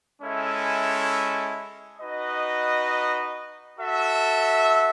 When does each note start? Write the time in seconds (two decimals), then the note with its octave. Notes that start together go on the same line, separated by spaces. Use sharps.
0.21 G#3 C#4 E4 A4 E5
1.99 D#4 F#4 B4 D#5
3.77 F#4 A4 E5